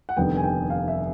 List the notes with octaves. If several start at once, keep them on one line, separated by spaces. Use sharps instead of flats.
F#5
F1 D#2 D3 G3 B3 G5
G#5
G5
F5
E5